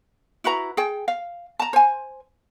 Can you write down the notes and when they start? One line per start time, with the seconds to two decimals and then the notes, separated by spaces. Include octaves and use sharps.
0.44 E4 F#4 B4 A#5
0.77 G#4 G5
1.08 F5
1.59 A5 A#5
1.73 C5 G#5